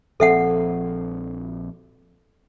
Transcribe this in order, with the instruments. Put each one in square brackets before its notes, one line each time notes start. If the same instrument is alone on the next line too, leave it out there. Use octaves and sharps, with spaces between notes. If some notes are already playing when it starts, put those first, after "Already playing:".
[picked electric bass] A#1 F3 C4 [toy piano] A4 E5 F#5